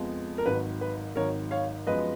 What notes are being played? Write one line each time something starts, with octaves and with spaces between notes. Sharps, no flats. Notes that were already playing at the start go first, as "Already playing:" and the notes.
Already playing: F2 F3 G#3 B3
A#4
G#1 G#2 D#3 F#3 B4
B4
G#1 G#2 D#3 F#3 A#4 C#5
C#5 F5
F#2 F3 G#3 B3 B4 D#5